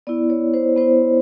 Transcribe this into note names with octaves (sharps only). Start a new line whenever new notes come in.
B3 E4 D5
C#5
C5
B3 E4 C5